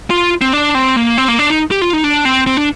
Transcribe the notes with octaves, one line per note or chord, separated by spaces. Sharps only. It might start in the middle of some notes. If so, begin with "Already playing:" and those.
F4
C4
D4
C4
A#3
C4
A#3
D4
D#4
G4
F4
D#4
D4
C4
C4
D4